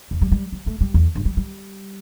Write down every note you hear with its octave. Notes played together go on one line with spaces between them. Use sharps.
E2
G3
G3
G3
A3
G3
E2
G2
G3
G3